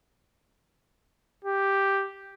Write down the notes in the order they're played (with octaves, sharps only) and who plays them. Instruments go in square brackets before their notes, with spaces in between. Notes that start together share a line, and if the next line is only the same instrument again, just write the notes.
[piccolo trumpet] G4